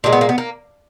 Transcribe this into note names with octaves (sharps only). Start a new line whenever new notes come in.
A#2 F3 G#3 A#3
B3
A#3
B3
A#3